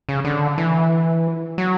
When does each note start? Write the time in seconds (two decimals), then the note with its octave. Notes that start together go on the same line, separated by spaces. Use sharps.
0.09 C#3
0.24 D3
0.58 E3
1.58 F#3